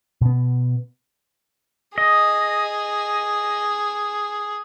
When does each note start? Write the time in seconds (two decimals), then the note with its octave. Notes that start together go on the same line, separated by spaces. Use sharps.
0.21 B2 B3
1.98 G#4 D#5